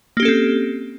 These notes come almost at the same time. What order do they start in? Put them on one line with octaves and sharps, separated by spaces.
A#3 G4 C#4 A4 C4